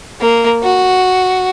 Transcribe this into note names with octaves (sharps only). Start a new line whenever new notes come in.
A#3
F#4